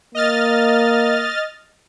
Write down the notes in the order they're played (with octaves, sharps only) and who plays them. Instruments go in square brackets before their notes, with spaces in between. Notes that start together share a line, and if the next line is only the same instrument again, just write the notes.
[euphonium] A#3 [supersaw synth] D#5 F6 A6